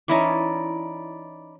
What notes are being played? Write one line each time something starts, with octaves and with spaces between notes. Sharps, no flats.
E3 C#4 D#4 E4 D5